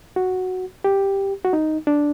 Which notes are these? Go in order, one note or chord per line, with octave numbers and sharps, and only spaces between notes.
F#4
G4
F#4
D#4
D4